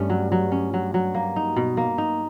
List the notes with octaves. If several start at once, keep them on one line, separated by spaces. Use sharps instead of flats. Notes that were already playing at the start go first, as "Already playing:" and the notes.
Already playing: G2 A3 C#4
F#3
F#3
C#4
F#3
F#3
A#3
D#4
B2
A#3
D#4